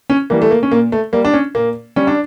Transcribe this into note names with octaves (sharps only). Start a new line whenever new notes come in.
C#4
E3 G3 A#3
A3
A#3
C#4
A#2 A#3
A3
G3 A#3
D4
C#4
A#2 A#3
G3 C#4
D4